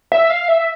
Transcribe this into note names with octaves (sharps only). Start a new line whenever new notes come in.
E5
F5
E5